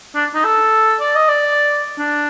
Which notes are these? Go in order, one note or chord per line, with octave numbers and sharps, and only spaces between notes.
D4
D#4
A4
D5
D#5
D5
D4